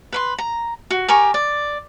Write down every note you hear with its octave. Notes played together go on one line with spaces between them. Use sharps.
B4 B5 C6
A#5
F#4
G4 A#4 G#5 C#6
D5